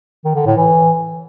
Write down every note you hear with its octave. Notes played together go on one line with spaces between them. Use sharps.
D#3
D3
A2
E3